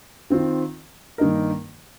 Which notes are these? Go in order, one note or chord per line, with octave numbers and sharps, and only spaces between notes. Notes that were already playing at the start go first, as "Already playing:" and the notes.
D#3 C4 F4
G2 D#3 A#3 D#4 A#4